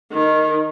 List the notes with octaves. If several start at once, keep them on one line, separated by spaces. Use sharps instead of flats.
D#3